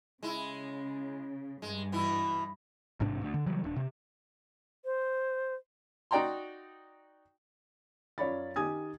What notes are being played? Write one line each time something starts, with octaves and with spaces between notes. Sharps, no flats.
C#3 G#3 E4
G2 G#3
B2 E3 E4
A1 G#2 C3 D4
D2
D3
C#3 E3 F#3 G3
D#1 D4
C3
C5
D#4 F#4 D5 G5 A#5 C6
F#2 F4 C#5 D5 B5 A6
D#3 G4 G#5 D#6 G#6